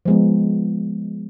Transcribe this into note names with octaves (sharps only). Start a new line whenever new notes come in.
F3 G#3 B3